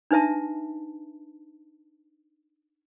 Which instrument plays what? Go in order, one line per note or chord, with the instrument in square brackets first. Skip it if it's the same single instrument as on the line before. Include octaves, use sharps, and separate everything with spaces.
[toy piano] D4 D#4 B4 E5 A5